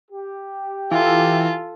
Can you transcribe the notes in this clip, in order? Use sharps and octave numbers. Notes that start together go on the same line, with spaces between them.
G4
E3 F4 A4